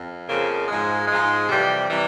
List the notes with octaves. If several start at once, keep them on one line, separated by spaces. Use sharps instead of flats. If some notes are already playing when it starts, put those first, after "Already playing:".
Already playing: F2
F2 C#3 F3 A#3
G#2 F3 G#3
G#2 F3 G#3
F2 C3 E3 G3
C3 E3 G3